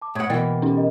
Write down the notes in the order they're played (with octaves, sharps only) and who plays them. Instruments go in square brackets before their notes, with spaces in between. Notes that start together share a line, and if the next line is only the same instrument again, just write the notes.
[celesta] A5 D6
[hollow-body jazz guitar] A2 F#5 [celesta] D#6 G#6
[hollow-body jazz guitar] B2 E3 A#3 [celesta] F#5 G5 A6
[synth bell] C#4 D#4
[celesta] A#4 D#5 F#5